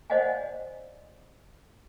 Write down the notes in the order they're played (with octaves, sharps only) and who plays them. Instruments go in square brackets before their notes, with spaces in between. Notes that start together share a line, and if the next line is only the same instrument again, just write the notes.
[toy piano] C5 D5 D#5 F5 F#5 G#5